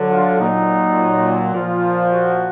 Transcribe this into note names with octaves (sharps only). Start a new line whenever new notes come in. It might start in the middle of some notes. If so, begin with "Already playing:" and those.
Already playing: D3 F#3
F4
A#2 F#3 D#4
A#2 F3 F4
F#4